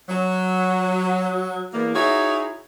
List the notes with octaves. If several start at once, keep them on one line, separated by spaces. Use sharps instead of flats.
F#3
E2 A#3
D#4 E4 F#4 G#4 C#5